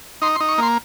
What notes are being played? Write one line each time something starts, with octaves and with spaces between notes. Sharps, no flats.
D#4 C6
C6
D#4
C#6
A#3 C6